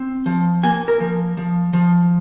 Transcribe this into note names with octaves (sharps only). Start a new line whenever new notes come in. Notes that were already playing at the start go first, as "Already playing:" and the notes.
Already playing: C4
F3
A#3 G#5
A#4
F3
F3
F3